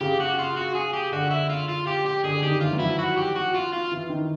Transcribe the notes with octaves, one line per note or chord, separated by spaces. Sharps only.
C#3 G4
F#4
F4
F#4
G#4
G4
D3 F#4
E4
F4
F4
G4
G4
D3 G#4
D#3 G4
E3 F4
F#3
F3 E4
F#4
G4
F#4
F4
F4
E3
D#3